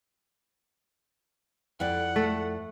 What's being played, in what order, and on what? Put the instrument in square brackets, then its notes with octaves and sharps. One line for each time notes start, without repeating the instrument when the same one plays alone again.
[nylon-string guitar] F2 E4 D5 [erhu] F#5
[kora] A3